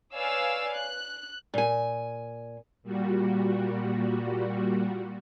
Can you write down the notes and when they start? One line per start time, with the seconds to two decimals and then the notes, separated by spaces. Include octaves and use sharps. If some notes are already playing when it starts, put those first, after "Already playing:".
0.15 B4 C#5 D5 F5 G#5 E6
0.75 F#6
1.54 A#2 G#5
2.83 A#2 G3 F#4